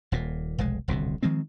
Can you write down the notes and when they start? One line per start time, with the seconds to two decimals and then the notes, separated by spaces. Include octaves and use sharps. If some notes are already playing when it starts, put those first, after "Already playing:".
0.12 D#1 A#2
0.58 F1 B1 G#3
0.88 D#1 C2 B2 D3
1.23 D#3 F3 G#3 C4